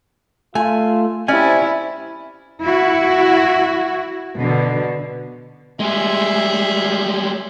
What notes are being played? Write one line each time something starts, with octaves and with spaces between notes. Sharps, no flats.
A3 F4 G#5
C3 C#4 E4 D5 G#5
E4 F#4
B2 D3
G3 G#3 G#4 E5